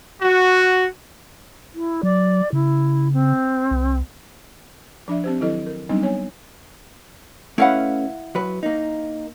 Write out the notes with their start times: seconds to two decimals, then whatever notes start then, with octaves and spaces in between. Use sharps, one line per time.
0.22 F#4
1.72 E4
2.03 F#3 D5
2.53 C#3 E4
3.12 C4
3.71 C2
5.08 F3 D4 D5 E5
5.24 C4 G4 C5
5.40 D#3 F#3 E4 A4 D#5
5.66 A#4
5.89 F#3 G3 B3 C4 D4 D#4
6.02 B3 C#5 G#5
7.58 A3 C#4 E4 B4 F5 F#5
8.35 F#3 B4
8.63 A#3 D#4